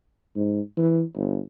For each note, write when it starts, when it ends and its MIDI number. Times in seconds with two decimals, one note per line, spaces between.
0.36 0.61 44
0.77 1.03 52
1.16 1.39 31